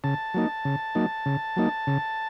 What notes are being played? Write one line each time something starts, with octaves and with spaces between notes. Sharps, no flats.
C#3 A5
F#3 A#3 D#4
C#3
F#3 A#3 D#4
C#3
F#3 A#3 D#4
C#3